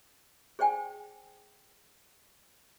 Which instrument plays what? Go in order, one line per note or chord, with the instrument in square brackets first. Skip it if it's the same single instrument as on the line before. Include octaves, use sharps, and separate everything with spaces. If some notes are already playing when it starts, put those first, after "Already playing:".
[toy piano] G#4 C5 D5 G5 G#5